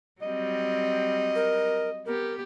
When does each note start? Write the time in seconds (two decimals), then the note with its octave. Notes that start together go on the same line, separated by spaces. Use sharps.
0.22 F#3 G3 C4 D#5
1.35 A#4
2.06 B3 G4 A#4